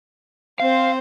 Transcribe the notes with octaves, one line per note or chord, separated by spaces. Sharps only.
C4 C5 F5